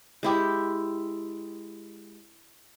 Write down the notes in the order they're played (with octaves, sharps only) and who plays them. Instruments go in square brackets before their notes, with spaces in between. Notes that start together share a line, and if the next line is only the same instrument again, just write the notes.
[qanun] G#3 E4 G4